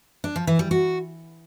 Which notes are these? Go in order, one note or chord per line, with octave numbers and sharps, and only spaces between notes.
D4
F3
E3
G3
F#4